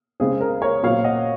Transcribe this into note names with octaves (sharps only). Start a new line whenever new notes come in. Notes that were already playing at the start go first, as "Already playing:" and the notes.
C#3 G#3 C4 G#4
A#4
A#4 C#5
A#2 F#3 C4 C#5 F5
D#5 F#5